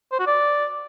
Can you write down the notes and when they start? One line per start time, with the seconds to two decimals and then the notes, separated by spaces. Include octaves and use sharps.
0.12 C5
0.19 F#4
0.26 D5